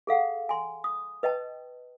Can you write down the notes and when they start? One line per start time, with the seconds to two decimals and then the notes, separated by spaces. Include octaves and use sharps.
0.07 G#4 A4 F5 F#5
0.49 G#5 C6
0.84 D#6
1.23 B4 D#5 G5 A5